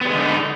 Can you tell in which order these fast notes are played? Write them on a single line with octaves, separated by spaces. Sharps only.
B3 G3 G#3 D3 D#4